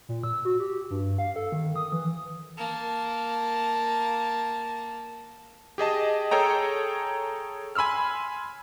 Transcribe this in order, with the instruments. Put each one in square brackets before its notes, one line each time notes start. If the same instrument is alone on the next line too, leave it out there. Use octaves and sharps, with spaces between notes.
[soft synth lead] A#2
E6
F#4
G4
G2
F5
A4
D#3
D#6
E3
[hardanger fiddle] A#3 A5
[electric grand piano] G4 G#4 D#5 A5
G#4 A4 C#5 G5 A#5
G#5 B5 C6 E6 F6